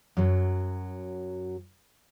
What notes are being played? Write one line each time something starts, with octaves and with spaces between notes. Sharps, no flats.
F#2 F#3